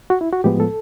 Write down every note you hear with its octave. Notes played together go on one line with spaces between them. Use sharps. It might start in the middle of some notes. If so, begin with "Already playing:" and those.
F#4
E4
F#4
A2 F3 G#3 B3 G4
A4